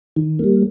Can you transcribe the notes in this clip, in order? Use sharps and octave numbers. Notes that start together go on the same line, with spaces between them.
D#3
G3 A#3